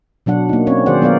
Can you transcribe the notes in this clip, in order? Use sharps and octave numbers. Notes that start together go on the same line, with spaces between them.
B2 F#3 D4 F#5
A#3 D#4
C4 C#4 C#5
D#3 F#4 G#4 C5 D5 F#5
F#3 B3 F4 A#4 D5 F5